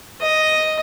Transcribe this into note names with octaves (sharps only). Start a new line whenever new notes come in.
D#5